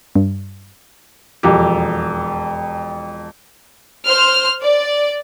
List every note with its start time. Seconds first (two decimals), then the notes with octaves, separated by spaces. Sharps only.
0.16 G2
1.43 E1 F2 G4
4.07 C5 F6
4.63 D5